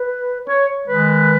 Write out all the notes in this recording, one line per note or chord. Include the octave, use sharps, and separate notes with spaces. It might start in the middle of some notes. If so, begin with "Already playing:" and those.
Already playing: B4
C#5
D#3 G#3 B4